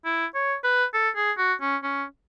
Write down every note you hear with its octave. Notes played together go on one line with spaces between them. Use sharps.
E4
C#5
B4
A4
G#4
F#4
C#4
C#4